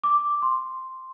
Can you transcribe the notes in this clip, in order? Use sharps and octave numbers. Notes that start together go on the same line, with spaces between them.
D6
C6